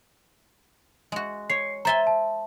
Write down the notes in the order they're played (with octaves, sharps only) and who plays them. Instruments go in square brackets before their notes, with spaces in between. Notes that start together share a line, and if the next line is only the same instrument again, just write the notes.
[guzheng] G#3 F#4
[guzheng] C#5 [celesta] C7
[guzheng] C5 E5 G#5 [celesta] A#5 A6 G7
[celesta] A5